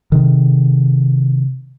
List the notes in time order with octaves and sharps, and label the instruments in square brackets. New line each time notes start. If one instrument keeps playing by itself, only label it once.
[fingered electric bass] C3 D#3